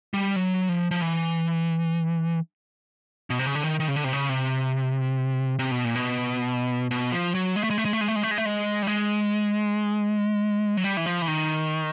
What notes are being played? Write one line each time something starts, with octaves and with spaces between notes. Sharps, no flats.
G3
F#3
F3
F3
E3
B2
C3
C#3
D3
D#3
D#3
C#3
D3
C3
C#3
C3
C3
B2
A#2
B2
B2
F3
F#3
G#3
A3
G#3
A3
G#3
A3
G#3
A3
G#3
A3
G#3
A3
G#3
G3
G#3
F#3
G3
E3
F3
E3
D#3